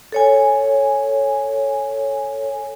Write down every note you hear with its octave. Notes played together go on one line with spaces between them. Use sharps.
A4 C#5 G#5